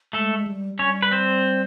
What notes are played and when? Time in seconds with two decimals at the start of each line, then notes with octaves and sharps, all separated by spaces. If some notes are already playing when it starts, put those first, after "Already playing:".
0.13 G#3 A3 A4
0.36 G#3
0.47 G3
0.79 G3 C#4 C#5
1.03 B4
1.12 C4 C5